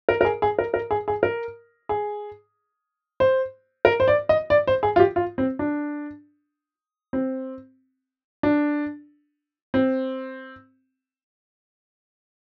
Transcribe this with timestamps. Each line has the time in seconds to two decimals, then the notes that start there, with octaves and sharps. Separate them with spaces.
0.09 A#4
0.21 A#4
0.25 G#4
0.42 G#4
0.59 A#4
0.74 A#4
0.91 G#4
1.08 G#4
1.23 A#4
1.89 G#4
3.20 C5
3.85 A#4
4.00 C5
4.08 D5
4.29 D#5
4.50 D5
4.67 C5
4.83 G#4
4.96 F4
5.00 G4
5.16 F4
5.38 C4
5.59 D4
7.13 C4
8.43 D4
9.74 C4